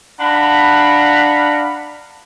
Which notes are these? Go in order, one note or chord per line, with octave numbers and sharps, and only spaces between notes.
D4 F5 F#5 A#5 B5